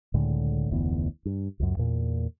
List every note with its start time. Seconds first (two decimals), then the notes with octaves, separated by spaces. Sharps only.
0.14 C#2 A2 D3 G#3
0.70 F1 D2 E3 B3
1.25 G2
1.60 C#2 F#2
1.77 E2 A#2